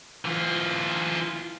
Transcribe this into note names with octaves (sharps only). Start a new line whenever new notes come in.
E3 F4